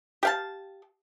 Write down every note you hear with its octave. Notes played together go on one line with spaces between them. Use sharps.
G4 F5 A5